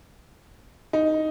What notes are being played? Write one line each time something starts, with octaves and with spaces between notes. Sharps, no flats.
D#4